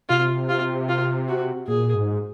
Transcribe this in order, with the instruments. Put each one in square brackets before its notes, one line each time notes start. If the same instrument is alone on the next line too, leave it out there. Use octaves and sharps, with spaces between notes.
[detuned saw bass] C3 [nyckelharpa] F4
[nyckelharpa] F4
F4
F#4
[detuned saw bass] A#2 [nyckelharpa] G#4
[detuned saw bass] G#2